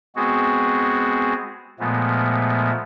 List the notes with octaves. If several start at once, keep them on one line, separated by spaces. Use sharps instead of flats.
G#3 B3 C4 F#4 G#4
A#2 F3 G#3 A3 B3